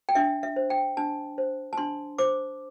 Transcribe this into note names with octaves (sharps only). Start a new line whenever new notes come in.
G5
D4 E5
E5
C5
G5
D4 A5
C5
A5
D4 C6
C5 D6